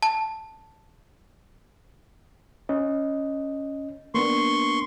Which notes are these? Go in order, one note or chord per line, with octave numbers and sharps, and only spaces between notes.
A5
C#4 D#5
A#3 B3 D4 C6 C#6